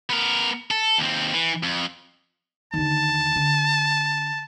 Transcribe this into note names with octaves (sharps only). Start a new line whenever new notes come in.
B3 A#4
A4
D#2 C4
E3
F2
D#2 D3 A5
D3